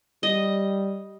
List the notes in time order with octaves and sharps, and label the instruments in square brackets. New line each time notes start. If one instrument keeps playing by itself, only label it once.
[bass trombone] G3 [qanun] D#5